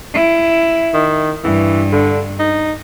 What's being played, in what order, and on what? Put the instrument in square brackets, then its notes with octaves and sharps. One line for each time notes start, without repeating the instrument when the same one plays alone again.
[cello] E4
[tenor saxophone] D#3
[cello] G2 [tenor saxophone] E3
[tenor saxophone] D3
D#4